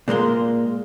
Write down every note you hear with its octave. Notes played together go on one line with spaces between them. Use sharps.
A#2 G#3 A#3 C6